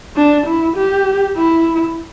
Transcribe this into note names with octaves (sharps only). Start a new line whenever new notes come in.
D4
E4
G4
E4